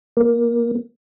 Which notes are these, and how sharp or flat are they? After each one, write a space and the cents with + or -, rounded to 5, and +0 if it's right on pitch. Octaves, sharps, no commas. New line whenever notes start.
A#3 +15